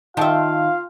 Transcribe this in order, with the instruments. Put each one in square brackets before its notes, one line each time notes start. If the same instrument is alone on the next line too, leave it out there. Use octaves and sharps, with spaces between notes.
[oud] D#3 E5 [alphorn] F4 [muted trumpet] F5 [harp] G5 A5 C6